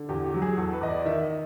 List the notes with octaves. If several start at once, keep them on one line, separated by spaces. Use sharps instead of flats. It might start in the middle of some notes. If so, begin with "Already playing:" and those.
Already playing: D3
E2 G4
G4
F#3
G#4
E2 A4
B4
E2 D#5
D5
D#3 E5
D#5